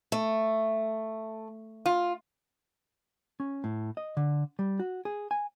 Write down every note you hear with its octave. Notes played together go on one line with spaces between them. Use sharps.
A3
F4
C#4
A2
D#5
D3
G3
F#4
G#4
G#5